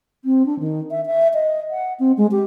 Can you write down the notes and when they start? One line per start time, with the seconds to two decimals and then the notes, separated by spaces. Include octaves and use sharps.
0.25 C4
0.46 D4
0.60 D#3
0.91 E5
1.06 E5
1.34 D#5
1.70 F#5
2.00 C4
2.17 G#3
2.31 G4